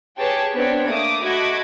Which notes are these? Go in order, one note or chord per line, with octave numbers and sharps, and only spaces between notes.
G4 G#4 B4 C#5 G5 A5
B3 C4 D4 C#5 G5
A3 A#3 D6 D#6
A3 F#4 D#5 B5 D6 G#6